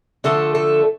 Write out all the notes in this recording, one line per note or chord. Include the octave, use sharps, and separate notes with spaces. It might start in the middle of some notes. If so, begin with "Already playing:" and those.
D3 F3 A3 A4
A4